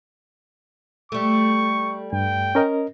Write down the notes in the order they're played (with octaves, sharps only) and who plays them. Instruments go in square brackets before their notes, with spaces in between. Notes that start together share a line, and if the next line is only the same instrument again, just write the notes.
[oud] G3 A3 [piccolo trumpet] C#6
[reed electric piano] G2 [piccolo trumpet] G5
[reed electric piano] C#4 A#4 D#5